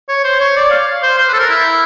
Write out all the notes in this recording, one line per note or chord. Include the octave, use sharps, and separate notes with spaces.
C#5
C5
C#5
D5
F5
C5
C5
B4
A4
A#4
E4